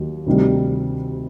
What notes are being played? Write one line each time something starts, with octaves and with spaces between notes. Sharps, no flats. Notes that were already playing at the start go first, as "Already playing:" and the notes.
Already playing: D#2 D#3 F#3
D2 C3 D#3 G3